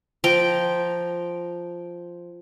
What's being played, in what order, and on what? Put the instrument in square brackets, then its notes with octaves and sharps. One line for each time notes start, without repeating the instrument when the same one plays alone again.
[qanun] F3 G5 A#5